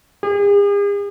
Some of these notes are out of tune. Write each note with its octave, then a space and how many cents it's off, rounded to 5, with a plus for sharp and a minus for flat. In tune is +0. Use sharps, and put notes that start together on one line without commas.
G#4 -45